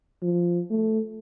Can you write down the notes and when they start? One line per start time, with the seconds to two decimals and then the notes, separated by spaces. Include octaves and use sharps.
0.22 F3
0.71 A3